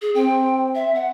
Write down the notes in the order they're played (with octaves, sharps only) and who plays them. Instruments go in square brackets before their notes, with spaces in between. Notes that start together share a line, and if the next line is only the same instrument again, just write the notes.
[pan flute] G#4
[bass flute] C4 [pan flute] G5
[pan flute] E5
F#5